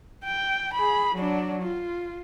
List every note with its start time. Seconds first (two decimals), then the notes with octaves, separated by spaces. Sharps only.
0.24 G5
0.74 G#4 B5
1.15 F#3 D4
1.63 F4